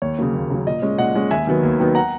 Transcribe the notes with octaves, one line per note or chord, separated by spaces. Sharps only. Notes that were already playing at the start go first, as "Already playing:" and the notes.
D#2 C#5
C#3 F#3 A#3
D#2
C#3 F#3 A#3
A#2 D#5
G#3 C#4
A#2 D#5 F#5
G#3 C#4
D#2 E5 G#5
D#3 F#3 B3
D#2
D#3 F#3 B3
F#5 A#5